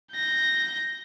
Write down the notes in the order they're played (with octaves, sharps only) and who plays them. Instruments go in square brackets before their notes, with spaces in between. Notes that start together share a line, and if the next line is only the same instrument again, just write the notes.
[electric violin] G6 A#6